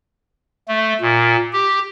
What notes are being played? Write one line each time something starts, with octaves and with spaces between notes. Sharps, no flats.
A3
A#2
G4